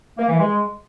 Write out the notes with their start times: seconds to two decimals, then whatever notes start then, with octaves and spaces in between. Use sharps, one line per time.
0.18 A#3
0.29 E3
0.39 G#3